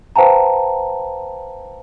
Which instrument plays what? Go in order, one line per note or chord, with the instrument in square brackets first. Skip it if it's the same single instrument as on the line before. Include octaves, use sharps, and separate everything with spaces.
[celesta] B4 C5 F5 G5 A5 A#5